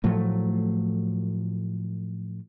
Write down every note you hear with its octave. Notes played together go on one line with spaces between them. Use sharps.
A2 F3 F#3 A3